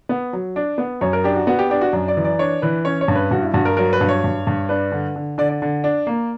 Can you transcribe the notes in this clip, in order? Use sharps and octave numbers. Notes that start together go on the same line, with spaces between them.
B3
F#3
D4
B3
F#2 C#5
A#4
D4 G4
F#4
B3 F#4
G4
D4 G4
F#4
F#2
D5
E3
D5
D4 C#5
E3 B4
C#4 C#5
C#5
G2
B4
G2 F#4
E4
G2 F#4
A#4
F#3 A#4
B4
G2
C#5
G2
G2
D4 B4
D3
D3
D3 D5
D5
D3
D4
A#3